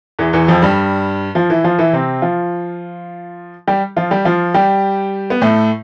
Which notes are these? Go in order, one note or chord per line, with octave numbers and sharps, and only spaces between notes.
E2 E3
E2 E3
F2 F3
G2 G3
F3 F4
E3 E4
F3 F4
E3 E4
C3 C4
F3 F4
G3 G4
F3 F4
G3 G4
F3 F4
G3 G4
B3
A2 A3